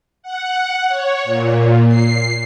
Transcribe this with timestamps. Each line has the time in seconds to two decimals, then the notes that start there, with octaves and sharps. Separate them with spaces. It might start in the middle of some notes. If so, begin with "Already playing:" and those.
0.23 F#5
0.89 C#5
1.24 A#2
1.88 C7